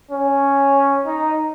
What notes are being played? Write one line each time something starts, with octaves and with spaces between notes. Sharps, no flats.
C#4
D#4